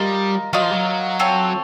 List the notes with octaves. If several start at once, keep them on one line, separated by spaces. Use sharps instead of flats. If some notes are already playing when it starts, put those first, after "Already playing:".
Already playing: G3 F4 A#4 D#5
F#3 F4 A#4 D#5
F3
F#3
C4 F4 A4 C#5